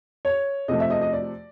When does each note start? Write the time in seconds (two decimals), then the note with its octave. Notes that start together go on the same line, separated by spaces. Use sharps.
0.25 C#5
0.68 C3 F3 A3 D#5
0.80 E5
0.90 D#5
1.01 D#5
1.13 D5